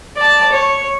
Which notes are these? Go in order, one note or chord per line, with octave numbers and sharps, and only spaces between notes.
D5 A5
C#5